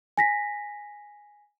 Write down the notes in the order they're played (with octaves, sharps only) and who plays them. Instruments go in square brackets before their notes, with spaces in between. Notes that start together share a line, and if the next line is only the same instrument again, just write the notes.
[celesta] G#5 A#6 B6